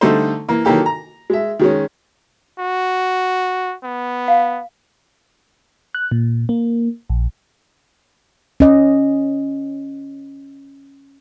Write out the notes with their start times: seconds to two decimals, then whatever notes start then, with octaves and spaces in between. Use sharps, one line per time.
0.01 D3 G3 A3 D#4 A4 C5
0.49 E3 A#3
0.65 D#3 E3 F#3 A#3 G4 A4
0.86 A#5
1.30 G#3 E5
1.59 D#3 G#3 C#4
2.59 F#4
3.84 B3
4.28 F5
5.95 F#6
6.11 A#2
6.49 A#3
7.10 A#1
8.60 C#4 D#5